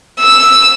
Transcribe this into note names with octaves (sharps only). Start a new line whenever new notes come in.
E6